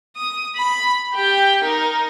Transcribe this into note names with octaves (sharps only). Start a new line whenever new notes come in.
D#6
B5
G4 G5
D#4 A#4